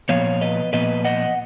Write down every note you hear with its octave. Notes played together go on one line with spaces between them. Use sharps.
A#2 F3 B3 C#5 F5
B4 D#5
A#2 F3 B3 B4 D#5
D#5 F#5